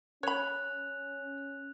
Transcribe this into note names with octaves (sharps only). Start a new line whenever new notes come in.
C#4 C#5 B5 F#6 F7